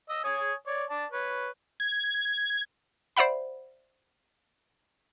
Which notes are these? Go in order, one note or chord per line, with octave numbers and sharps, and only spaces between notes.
D#5 E6
C#5 G#5 D#6
C#5 D5
D5 A5
B4 C#5
G#6
C5 D5 E5 F#5 B5